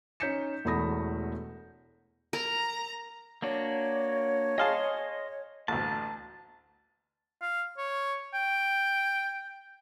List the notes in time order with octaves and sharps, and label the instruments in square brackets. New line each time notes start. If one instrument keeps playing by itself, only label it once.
[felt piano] C#4 D#4 G6 B6 C#7 E7
E1 E2 A3 B5 D#6 A#6
[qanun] A#4 [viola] A#5
[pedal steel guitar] A#3 D4 F#4 [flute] C#5
[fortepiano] G#4 F5 A5 [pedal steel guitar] D#5 C6
[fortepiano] A1 D2 [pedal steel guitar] A5
[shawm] F5
C#5
G5